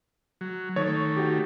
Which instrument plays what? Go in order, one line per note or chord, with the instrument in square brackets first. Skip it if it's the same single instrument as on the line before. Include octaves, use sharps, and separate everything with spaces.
[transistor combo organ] F#3
[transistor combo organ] D#3 A3 [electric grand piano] C#5
[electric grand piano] F#4 G4